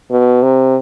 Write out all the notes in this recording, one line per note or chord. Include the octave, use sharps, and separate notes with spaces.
B2
C3